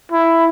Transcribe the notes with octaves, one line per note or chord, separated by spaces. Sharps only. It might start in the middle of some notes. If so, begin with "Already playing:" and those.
E4